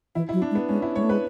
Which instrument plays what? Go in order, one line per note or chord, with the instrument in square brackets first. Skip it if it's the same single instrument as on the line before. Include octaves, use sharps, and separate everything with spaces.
[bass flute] E3 [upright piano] E4
[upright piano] E4
[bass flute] F#3
[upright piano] D4
[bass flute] G#3
[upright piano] B3
[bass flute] G#3 [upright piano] C#4
[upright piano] E4
[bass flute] G#3 [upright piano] C#5
[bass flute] A3
[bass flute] G#3 [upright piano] B4